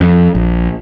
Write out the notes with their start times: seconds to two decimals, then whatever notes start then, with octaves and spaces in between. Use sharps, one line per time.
0.01 F2
0.35 A#1